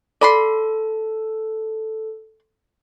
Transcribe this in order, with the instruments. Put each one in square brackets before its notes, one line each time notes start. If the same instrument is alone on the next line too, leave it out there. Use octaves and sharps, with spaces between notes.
[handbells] A4 [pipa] D5 B5 C6